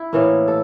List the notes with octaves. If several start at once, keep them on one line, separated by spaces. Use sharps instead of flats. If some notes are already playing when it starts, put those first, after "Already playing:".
Already playing: E4
A2 E3 A#3
A4